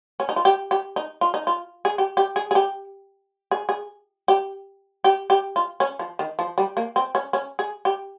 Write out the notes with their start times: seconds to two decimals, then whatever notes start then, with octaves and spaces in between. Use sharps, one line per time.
0.20 C#4
0.29 D#4
0.36 F4
0.45 G4
0.71 G4
0.96 D#4
1.21 F4
1.34 D#4
1.47 F4
1.85 G#4
1.98 G4
2.17 G4
2.36 G#4
2.51 G#4
2.55 G4
3.51 G#4
3.69 G#4
4.28 G4
5.04 G4
5.30 G4
5.56 F4
5.80 C#4
5.99 F3
6.19 D#3
6.39 F3
6.58 G3
6.77 A#3
6.96 C4
7.15 C#4
7.33 C#4
7.59 G#4
7.85 G4